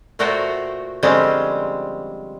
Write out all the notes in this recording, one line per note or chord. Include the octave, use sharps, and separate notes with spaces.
A#2 A3 F#4 A#4 C5 G5
D3 F3 G3 G#3 C4 C#4